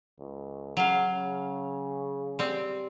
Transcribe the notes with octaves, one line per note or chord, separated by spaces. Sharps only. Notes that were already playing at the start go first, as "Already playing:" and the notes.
C#2
C#3 F#3 F5
C#3
G3 C4